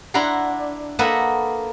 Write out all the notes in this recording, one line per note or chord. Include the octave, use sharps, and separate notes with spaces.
D4 E4 F#5 A#5 C6
A#3 A4 B4 D#5 E5 F#5